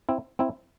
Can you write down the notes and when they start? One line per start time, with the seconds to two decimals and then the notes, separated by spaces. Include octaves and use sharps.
0.09 C4 E4
0.39 C4 E4